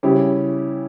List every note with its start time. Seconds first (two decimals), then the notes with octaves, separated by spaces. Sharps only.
0.03 C#3 G3 C#4 E4 G4